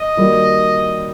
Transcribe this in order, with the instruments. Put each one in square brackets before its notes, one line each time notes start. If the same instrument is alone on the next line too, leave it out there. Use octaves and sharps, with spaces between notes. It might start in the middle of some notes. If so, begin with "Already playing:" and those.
Already playing: [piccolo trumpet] D#5
[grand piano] D#3 G3 A#3 F#4